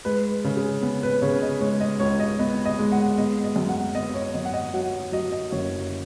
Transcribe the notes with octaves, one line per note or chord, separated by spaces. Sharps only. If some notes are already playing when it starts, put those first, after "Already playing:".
G#3 B4
C#3
G#4
B3
B4
C#3 C#5
D#5
G#3 C#5
D#5
C#2 C#5
D#5
B3 D#5
D#5
G#3
F#5
B3 D#5
D#5
F#2
F#5
B3 D#5
C#5
F#2 D#5
F#5
D#5
F#3 F#5
F#3 D#5
D#5
F#1 C#5